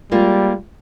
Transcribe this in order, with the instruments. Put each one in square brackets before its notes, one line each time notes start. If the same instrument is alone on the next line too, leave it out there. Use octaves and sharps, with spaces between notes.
[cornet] G3 [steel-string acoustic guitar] G#3 A#3 F4